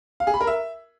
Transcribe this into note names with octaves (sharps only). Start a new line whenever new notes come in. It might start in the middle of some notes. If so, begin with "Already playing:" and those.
F5
G#4
B5
A#4
E5